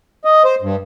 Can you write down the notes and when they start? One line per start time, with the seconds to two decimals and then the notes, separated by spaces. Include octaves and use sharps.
0.25 D#5
0.44 C5
0.62 G2